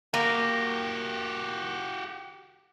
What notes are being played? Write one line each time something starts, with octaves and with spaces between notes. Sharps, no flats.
A#3 F#4 G4